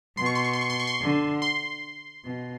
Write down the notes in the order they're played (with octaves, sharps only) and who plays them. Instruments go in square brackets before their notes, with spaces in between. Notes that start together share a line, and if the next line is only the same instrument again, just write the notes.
[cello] B2 [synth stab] C6
[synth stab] C#6
C6
C#6
C6
C#6
C6
C#6
C6
[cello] D3
[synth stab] C6
[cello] B2